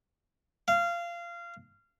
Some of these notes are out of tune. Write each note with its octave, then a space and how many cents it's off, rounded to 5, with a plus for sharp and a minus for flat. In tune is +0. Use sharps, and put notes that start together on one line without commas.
F5 -20